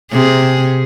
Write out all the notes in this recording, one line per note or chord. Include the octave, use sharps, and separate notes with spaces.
C3 G#4